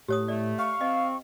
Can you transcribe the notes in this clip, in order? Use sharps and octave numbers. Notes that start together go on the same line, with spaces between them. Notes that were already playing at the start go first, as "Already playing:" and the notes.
A2 G4 C#5 D#6
A3 D5
F5 C#6
C4 D#5